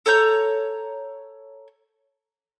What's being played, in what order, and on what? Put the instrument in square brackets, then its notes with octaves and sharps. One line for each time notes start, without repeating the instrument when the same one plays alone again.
[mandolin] A4 C#5 A#5 G6